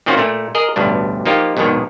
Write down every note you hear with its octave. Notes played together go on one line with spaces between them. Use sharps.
A#2 D#3 C4 C#4 F4 F#4
A#2 A3
G#4 A#4 D#5
A1 D2 G2 B2 D4
F3 A#3 D#4 F4 G4
A#1 D#2 G#2 B2 D#3 G#3